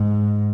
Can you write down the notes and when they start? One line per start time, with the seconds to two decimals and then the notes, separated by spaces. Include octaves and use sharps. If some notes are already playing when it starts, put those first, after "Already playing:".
Already playing: G#2